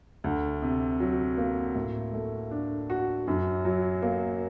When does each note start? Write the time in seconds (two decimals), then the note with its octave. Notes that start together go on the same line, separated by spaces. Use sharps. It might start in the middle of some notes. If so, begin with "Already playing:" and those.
0.24 D2
0.62 C3
1.00 F#3
1.37 A#3
1.75 A2
2.13 A3
2.51 D4
2.90 F#4
3.28 F#2
3.65 F#3
4.02 A#3